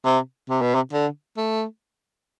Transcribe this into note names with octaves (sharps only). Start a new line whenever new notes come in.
C3
C3
B2
C3
D3
A3